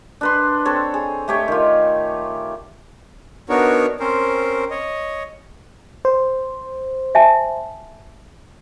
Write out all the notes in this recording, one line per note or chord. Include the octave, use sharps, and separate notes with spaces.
D4 B4 C6
C4 A4 C#5
G#4
A3 G4 C#5
D#3 F4
B3 D4 D#4 F#4 A#4 C#5
C4 C#4 A#4 C5
C#5 D#5
C5
E5 G#5 A5